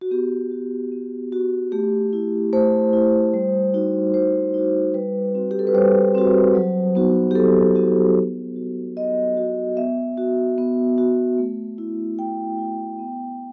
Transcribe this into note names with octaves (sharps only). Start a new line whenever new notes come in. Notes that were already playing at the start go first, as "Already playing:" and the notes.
F#4
B3 G4
F#4
B3
F#4
A3 G4
E4
A3 C5
E4
G3
D#4 F#4
G3 C5
D#4 F#4
G3 B4
C4 F#4
G4
A4
B4
G3 C5
C4 F#4
F#3
B3 D#4 F#4
G4
F#3 A4
B3 D#4 F#4
B3
F#4
B3 D#5
F#4
B3 E5
F#4
B3
F#4
A3
E4
A3 G5
E4
B3